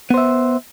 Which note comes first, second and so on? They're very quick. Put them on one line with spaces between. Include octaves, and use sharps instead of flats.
B3 C5 E5